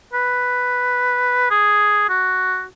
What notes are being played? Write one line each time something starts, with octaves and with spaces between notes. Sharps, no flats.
B4
G#4
F#4